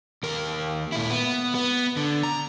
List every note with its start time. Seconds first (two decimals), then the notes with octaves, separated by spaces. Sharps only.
0.23 D#2 A#4
0.92 A#2 E4
1.09 B3
1.55 B3
1.96 D3
2.23 A#5